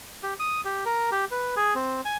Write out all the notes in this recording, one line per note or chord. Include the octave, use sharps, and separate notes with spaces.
G4
D#6
G4
A#4
G4
B4
G#4
C4
G#5